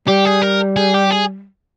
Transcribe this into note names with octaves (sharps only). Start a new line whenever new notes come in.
G3 G4
G#4
A#4
G#4
G4
G#4